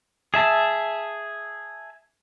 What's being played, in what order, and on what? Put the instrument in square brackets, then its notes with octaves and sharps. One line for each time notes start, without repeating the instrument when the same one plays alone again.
[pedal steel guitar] G#4 E5 A5